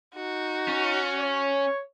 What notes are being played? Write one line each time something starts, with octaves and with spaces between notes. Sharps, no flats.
D#4 F#4
C#4
C#5